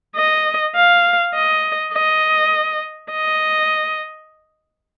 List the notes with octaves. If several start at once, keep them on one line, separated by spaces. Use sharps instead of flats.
D#5
F5
D#5
D#5
D#5